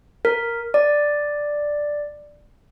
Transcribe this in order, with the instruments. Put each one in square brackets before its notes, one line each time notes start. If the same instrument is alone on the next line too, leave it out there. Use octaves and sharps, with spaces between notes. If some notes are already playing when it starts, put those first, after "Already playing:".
[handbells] A#4
D5